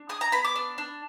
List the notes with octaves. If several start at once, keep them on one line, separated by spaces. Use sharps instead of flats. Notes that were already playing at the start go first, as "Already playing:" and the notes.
Already playing: D4
G#4 D#6
A#5
B3 B5
D6
D4
D4